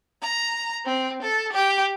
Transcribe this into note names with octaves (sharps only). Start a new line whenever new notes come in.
A#5
C4
A4
G4